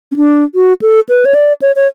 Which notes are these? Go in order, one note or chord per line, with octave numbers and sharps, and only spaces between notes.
C#4
D4
F#4
A4
B4
C#5
D5
C#5
C#5